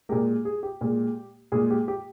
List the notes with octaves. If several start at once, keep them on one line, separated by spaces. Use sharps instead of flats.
A#2 G#3 G4 A#4
G#4
G4
A#2 G#3
A#2 G#3 G#4
G4
G4